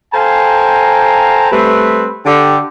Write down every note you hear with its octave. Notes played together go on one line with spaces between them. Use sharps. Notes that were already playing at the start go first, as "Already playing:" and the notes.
A4 C5 F5 G5 G#5 A#5
G3 A3 C4 B4
D3 G4